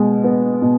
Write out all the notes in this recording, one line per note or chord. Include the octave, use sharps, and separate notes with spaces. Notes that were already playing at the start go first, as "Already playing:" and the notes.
Already playing: B2 G#3
B3
B2